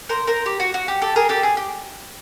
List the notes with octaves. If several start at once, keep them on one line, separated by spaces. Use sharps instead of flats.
A#4 C5
A#4 C5
G4
F#4
F#4
G4
G4 A4
G#4 A#4
G4 A4
G#4
G4